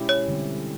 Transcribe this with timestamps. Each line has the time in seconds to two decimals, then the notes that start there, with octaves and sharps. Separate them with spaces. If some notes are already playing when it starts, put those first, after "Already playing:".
Already playing: B2 G#3 C#4 E4 G4
0.09 C#5
0.28 D3 G3 C4